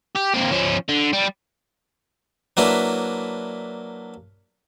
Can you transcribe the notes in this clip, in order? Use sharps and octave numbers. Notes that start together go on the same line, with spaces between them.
G4
A#3 C4
F3 C#4
D3
G3
F#3 A#3 D4 E4 B4